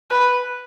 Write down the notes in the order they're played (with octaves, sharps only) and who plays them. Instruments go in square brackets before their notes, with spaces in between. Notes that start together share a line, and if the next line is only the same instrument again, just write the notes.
[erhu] B4